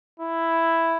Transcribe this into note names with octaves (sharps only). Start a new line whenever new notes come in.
E4